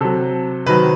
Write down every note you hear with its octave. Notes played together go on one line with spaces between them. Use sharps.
C3 F#3 A4
C3 D#3 F#3 B4